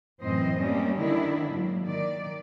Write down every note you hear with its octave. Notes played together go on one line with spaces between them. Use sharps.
F#2 A2 E3 C4 C5 D#5
G3 A#3 C#4 D4
D3 D#3 D4 E4
G#2 F#3 A#3
D#3 D5